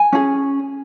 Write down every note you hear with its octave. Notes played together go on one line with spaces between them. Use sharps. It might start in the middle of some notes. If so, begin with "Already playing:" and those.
Already playing: G#5
C#4 G#4